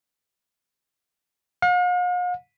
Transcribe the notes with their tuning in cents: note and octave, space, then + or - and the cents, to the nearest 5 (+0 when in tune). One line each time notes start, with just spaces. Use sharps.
F5 +45